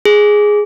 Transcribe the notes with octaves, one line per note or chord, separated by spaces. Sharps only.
G#4